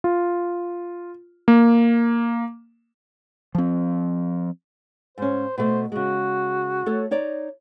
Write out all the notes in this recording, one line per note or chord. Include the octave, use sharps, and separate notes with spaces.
F4
A#3
F3 C4
G#2 C#4 C5
B2 A3 C5
C#3 G#3 F#4
A3 A4 C#5
D#4 C#5 D5